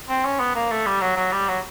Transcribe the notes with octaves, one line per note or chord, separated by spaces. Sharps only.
C4
C#4
B3
A#3
A3
G3
F#3
F#3
G3
F#3